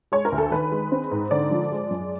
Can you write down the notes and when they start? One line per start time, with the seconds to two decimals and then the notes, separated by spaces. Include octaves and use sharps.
0.12 G#3 C#5
0.25 A#4
0.32 D2
0.38 A4
0.51 D#3 B4
0.72 G#3
0.92 C4
1.11 G#2
1.31 D3 D5
1.51 F3
1.72 G#3
1.91 F#2